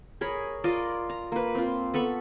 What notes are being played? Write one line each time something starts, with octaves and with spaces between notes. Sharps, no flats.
G#4 A#4 C#5 B5
F4 A#4 D5 D#5
A#5
A#3 B4
C4 F4
B3 A4 B5 C#6